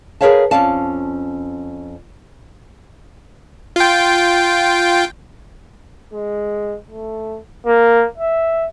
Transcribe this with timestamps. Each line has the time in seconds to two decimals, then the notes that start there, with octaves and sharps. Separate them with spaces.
0.21 G#4 A#4 B4 C#5 F5 A5
0.51 F2 E3 C#4 D5 F5 A5
3.76 F4 G5
6.14 G#3
6.90 A3
7.66 A#3
8.18 E5